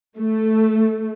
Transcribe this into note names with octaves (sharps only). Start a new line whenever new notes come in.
A3